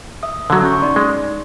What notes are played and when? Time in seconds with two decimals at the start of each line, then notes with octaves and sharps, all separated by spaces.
0.23 E5 D#6
0.50 D3 F#3
0.62 C#4 C#6
0.81 D#4 D5 C6
0.96 G#3